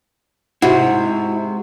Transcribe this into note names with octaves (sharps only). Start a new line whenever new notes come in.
G#2 C3 E4 F#4 F#5